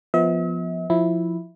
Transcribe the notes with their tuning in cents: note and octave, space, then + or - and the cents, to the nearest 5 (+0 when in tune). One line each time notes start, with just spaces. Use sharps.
F3 -5 B3 +0 E5 -45
F3 +0 E4 -5